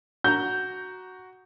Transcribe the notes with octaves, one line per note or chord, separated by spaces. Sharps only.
F#4 A#5 G6